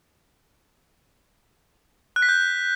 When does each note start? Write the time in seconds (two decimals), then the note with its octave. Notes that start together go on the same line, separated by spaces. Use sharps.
2.16 F#6
2.22 B6
2.29 G6